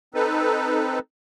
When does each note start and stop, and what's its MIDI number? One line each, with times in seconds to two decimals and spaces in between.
0.14 0.99 60
0.14 0.99 63
0.14 0.99 69
0.14 0.99 71